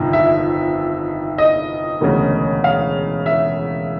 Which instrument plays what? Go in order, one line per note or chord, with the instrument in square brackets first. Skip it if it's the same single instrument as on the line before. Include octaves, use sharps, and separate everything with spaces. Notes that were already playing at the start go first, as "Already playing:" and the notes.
Already playing: [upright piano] G1 F2 C3 D#3
E5
D#5
E1 D2 C#3
F5
E5